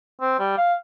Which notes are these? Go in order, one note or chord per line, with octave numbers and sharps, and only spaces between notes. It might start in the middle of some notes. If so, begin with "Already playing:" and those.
C4
G3
F5